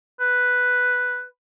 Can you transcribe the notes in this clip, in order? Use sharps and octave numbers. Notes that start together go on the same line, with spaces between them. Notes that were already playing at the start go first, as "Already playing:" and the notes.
B4